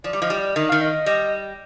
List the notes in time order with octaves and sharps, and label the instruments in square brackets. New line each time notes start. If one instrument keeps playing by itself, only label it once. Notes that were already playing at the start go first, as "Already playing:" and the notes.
[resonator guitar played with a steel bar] F3 [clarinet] D5
[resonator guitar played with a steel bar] G3
[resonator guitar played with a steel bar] F3 [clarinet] D#5
[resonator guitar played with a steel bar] G3
[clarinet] D5
[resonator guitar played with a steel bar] D#3 [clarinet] D#5
[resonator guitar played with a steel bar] D#3 [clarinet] F5
[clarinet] D#5
[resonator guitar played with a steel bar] G3 [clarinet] D#5